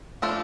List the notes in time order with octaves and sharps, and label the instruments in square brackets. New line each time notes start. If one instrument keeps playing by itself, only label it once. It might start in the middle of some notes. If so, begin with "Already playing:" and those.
[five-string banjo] F3 A3 D4 F4